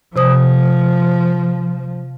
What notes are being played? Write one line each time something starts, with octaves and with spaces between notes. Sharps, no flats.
C3 F3 C5 D#6